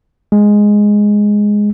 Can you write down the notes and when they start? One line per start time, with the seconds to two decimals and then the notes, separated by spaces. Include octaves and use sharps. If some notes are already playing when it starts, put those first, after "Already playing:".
0.32 G#3